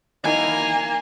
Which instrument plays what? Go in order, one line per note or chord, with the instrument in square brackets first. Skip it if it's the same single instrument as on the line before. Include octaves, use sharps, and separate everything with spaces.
[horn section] D#3 D#4 E4 [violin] A#3 [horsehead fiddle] G#5